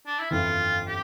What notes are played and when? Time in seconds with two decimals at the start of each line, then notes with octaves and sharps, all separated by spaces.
0.06 D4
0.19 E4
0.30 G1 F2 E3 F4
0.87 G4